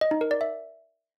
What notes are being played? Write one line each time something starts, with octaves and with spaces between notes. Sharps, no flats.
D#5
D#4
A#4
D5
E5